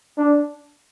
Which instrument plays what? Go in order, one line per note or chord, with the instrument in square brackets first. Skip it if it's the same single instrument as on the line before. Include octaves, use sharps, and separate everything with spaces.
[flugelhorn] D4